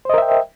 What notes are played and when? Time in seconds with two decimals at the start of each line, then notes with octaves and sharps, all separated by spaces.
0.05 C5
0.09 D#5
0.14 A#4
0.18 E5
0.22 G5